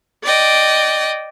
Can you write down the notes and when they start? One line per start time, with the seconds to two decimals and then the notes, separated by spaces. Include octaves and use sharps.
0.23 D5 D#5 G5